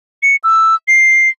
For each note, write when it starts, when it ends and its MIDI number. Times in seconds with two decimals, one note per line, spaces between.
0.23 0.36 97
0.44 0.75 88
0.88 1.29 96